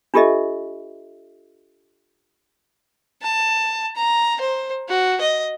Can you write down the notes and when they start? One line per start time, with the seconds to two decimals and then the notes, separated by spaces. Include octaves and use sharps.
0.14 D4 F4 G4 A4 D#5 E5
3.22 A5
3.96 A#5
4.41 C5
4.88 F#4
5.21 D#5